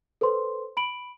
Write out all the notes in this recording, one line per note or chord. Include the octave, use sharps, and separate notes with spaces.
A4 B4 C5 C6
B5 D7 F#7